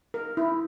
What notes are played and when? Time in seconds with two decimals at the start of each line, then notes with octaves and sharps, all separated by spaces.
0.14 A#4
0.37 E4